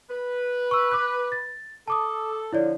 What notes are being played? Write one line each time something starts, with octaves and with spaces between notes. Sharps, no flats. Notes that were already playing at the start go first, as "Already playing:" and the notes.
B4
C#6 E6
D6 F#6
A6
A4 A5 D6 D#6
D3 F3 E4 C#5 D5